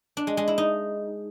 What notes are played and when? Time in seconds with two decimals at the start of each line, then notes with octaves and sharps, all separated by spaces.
0.17 D4
0.27 G#3
0.37 G#3
0.48 E4
0.58 D#4